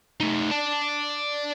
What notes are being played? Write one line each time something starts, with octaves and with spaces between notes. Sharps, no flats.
A3 D#4
D5 A5